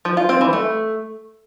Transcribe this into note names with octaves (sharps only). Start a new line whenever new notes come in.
F3
F4
C4
E3
A3